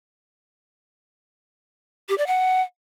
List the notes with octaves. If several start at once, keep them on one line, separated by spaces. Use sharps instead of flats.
G4
D5
F#5